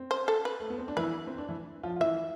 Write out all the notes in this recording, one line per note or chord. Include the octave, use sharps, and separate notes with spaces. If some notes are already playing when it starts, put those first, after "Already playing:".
Already playing: C4
C5
A4
B4
A3
B3
C4
D4
E3 E4 B4
C4
D4
E3 E4
F3 F4
F4
E3 E4 E5